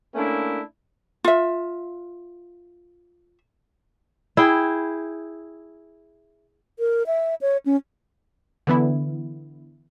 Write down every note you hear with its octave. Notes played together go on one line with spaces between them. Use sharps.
A3 A#3 C#4 D4 E4
F4 E5
E4 G#4 G5
A#4
E5
C#5
C#4
D3 E3 B3 E4